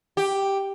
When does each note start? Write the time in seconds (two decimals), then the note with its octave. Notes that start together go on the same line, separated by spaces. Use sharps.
0.17 G4